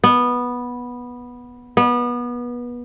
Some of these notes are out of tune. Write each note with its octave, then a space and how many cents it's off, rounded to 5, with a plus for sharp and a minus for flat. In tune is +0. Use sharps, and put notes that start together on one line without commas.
B3 -10
B3 -25